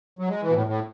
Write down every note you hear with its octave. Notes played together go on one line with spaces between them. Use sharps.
F#3
G#3
E3
B2
A2
A2